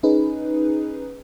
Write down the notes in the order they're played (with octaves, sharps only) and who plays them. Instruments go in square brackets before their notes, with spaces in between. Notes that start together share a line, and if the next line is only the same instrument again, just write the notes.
[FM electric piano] C#4 D#4 G#4 B4